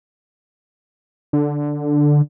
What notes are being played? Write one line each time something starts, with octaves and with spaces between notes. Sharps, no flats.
D3